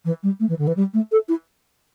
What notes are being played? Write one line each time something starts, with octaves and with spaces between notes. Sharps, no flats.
E3
G3
A3
E3
D3
E3
G3
A3
A4
E4